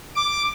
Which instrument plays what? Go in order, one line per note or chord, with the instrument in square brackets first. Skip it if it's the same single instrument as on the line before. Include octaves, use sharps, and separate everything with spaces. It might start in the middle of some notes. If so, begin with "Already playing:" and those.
[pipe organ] D6